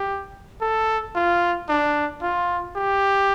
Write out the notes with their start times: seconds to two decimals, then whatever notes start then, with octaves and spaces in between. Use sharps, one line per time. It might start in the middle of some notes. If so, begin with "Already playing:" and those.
Already playing: G4
0.61 A4
1.15 F4
1.68 D4
2.22 F4
2.76 G4